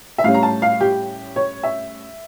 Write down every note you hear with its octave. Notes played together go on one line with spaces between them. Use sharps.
E5
A2 G3 C#4 F5
A#5
A5
F5
G4
C#5
E5